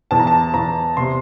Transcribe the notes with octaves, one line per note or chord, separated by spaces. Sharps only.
E2 A5
A#5
A5
E2 A#5
C3 C6